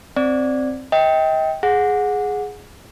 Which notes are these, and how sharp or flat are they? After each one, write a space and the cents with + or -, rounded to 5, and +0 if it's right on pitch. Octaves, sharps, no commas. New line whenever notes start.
C4 +0 D5 +0
D#5 +35 G5 +0
G#4 +0 F#5 -20